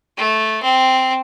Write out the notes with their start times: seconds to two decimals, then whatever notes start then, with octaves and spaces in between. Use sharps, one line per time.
0.17 A3
0.63 C4